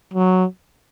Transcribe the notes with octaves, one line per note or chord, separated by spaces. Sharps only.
F#3